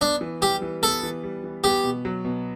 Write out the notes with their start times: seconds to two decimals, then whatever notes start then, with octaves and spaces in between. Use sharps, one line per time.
0.01 B3 D4
0.21 E3
0.41 G3 G4
0.62 E3
0.82 B3 A4
1.03 E3
1.23 G3
1.44 E3
1.64 B3 G4
1.84 B2
2.05 F#3
2.25 B2